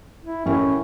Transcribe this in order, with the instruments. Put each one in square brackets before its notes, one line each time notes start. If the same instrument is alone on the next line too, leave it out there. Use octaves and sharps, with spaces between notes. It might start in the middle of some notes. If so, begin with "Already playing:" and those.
[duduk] E4
[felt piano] A1 E4 A#4 [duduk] C#4